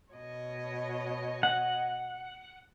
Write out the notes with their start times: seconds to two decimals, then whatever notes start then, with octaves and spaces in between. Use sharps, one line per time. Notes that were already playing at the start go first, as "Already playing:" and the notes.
0.14 B2 C#5 D#5
1.43 F#5